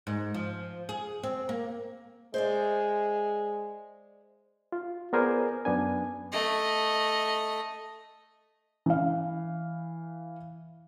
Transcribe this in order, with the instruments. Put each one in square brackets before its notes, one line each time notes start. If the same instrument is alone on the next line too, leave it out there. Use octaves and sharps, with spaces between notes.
[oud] G#2
F3
G#4
C4
A#3
[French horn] G#3 [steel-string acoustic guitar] C5 D5 E5
[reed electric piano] F4
B3 G#4 A#4 C5 D5 G#5
F#2 B3 D4 G#5
[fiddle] A3 D#5
[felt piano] E3 F5